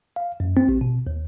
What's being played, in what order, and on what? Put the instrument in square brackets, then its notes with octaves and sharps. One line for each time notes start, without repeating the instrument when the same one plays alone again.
[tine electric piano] F5
F#2
C4
A1
B2
D#2